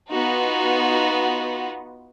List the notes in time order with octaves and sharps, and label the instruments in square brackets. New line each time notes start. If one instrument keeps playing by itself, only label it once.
[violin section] B3 D#4 F4 F#4